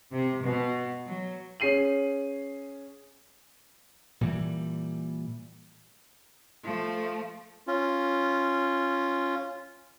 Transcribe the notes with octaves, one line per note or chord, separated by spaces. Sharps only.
C3
B2
F#3
C#4 G#4 C7 D#7 F#7
A#2 E3 G3
F3 A3
C#4 F4